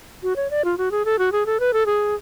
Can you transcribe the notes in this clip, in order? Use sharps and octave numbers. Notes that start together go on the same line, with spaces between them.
F#4
C#5
D5
F4
F#4
G#4
A4
F#4
G#4
A4
B4
A4
G#4